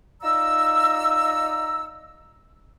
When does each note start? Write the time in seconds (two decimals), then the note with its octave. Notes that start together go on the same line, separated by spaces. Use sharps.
0.22 D#4 F4 D5 A#5 E6